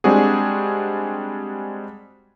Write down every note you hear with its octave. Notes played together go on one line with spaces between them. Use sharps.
G3 G#3 C4 D4 F#4 G#4